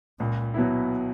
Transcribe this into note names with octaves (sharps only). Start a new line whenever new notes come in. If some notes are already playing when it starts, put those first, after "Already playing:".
C#2 A#2
B2 F#3 B3 E4